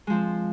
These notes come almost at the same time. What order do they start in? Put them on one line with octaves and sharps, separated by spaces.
G#3 F3 C4